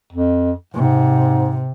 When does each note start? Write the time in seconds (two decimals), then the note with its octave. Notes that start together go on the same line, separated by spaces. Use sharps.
0.13 F2
0.74 G#2 C3